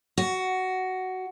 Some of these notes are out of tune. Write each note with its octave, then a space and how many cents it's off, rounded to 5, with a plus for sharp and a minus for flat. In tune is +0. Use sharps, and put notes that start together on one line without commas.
F#4 +10